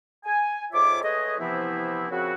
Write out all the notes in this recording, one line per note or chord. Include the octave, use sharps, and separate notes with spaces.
G#5
F2 G#2 F4 C#5 E5 D6
G#3 A3 G#4 B4 C#5 D#5
C3 E3 F3 B3 C4 E4
A#2 C#3 F3 C4 E4 F#4